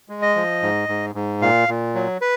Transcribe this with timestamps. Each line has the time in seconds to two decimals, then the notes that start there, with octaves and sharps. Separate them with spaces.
0.09 G#3
0.22 D#5
0.36 F3
0.62 G#2
0.89 G#2
1.15 G#2
1.41 A#2 F5
1.68 A#2
1.95 F#3
2.21 B4